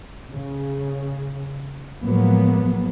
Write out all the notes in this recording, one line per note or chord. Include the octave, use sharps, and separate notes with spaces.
C#3
A2 F3 F#3 G#3 A#3 B3